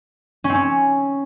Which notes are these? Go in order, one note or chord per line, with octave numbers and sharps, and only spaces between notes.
C#4
C4
C#4